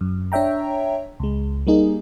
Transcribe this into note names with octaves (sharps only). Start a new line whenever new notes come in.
F#2
D4 C#5 E5 G5 A#5
C#2 G#3
G3 A#3 D#4 G#4